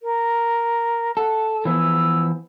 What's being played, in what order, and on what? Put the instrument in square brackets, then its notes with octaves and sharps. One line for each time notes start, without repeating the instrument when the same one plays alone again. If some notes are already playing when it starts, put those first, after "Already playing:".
[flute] A#4
[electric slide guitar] A4 [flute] F#5
[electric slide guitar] E3 F3 B3 [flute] E6